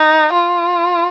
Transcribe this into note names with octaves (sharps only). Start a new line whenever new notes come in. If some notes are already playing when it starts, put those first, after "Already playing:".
Already playing: D#4
F4